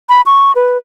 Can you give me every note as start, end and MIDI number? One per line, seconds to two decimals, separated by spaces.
0.09 0.21 83
0.26 0.52 85
0.55 0.77 71